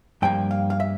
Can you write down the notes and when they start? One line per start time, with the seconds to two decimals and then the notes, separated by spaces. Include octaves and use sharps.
0.22 G2 F3 A#3 G5
0.51 F5
0.70 F5
0.80 E5